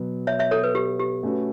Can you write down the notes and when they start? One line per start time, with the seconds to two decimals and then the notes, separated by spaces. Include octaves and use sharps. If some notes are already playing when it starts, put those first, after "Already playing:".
Already playing: B2 F#3 B3
0.27 C#5 E5
0.39 C#5 E5
0.51 A4 C#5
0.63 B4
0.75 G4
1.00 G4
1.23 A3 C#4 F#4 B4